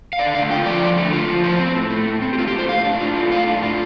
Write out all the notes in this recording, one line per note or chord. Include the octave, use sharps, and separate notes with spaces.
F5
D3 D5
A3 F5
F4 G5
F3 D5
D3
A3
F4
F3
A2 C5
C4
A2
A3
A2
C4
G4
A2 F4
G4
A3 C5
A2 F5
D4
F4
A3
A2 F5
D4
F4